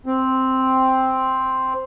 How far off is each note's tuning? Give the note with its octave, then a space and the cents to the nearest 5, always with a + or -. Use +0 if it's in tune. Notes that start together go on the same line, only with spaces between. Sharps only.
C4 +0